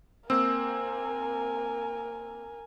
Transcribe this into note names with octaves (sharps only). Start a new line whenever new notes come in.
A#3 C4 A#4 G#5 E6